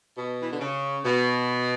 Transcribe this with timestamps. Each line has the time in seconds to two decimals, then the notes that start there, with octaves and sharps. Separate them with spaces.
0.17 B2
0.42 E3
0.51 D3
0.60 C#3
1.05 B2